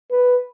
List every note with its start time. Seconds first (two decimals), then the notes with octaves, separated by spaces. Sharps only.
0.11 B4